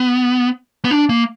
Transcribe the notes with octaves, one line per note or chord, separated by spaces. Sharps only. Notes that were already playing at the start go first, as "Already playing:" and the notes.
Already playing: B3
B3
D4
A#3